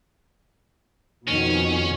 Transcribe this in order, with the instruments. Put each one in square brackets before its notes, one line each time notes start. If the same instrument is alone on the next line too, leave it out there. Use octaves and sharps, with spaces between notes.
[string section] F2 B2 D#3 [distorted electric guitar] C#4